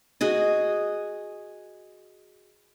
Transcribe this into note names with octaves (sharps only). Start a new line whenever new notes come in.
F#4 G#4 D#5